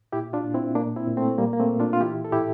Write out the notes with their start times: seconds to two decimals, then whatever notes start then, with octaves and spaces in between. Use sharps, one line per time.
0.12 A#2 E4 G4
0.33 D4 F4
0.44 A#2
0.54 C4 E4
0.75 A#2 A#3 D4
0.96 C4 E4
1.07 A#2
1.17 A3 C4
1.38 A#2 G3 A#3
1.53 A#3
1.59 A3 C4
1.69 A#2
1.80 D4 F4
1.93 F4
2.01 E3 E4 G4
2.25 A4
2.32 A2 E4 G4